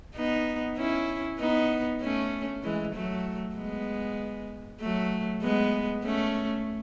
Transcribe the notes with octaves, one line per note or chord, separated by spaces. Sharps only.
B3 D#4
C#4 E4
B3 D#4
A3 C#4
E3 G#3
F#3 A3
G#3 B3
F#3 A3
G#3 B3
A3 C#4